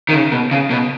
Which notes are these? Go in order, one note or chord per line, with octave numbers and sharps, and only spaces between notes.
D#3
C#3
B2
C#3
B2